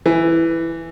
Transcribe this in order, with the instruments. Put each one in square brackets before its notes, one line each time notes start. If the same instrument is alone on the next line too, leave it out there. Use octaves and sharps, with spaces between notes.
[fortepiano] E3